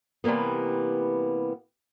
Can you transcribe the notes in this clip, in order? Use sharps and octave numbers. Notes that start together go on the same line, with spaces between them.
C3 E3 G3 A#3 B3